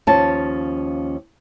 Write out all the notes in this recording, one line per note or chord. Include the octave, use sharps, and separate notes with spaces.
D#2 F3 C#4 A5